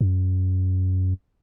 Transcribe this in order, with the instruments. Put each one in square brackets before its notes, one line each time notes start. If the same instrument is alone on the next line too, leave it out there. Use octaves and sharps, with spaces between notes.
[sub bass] F#2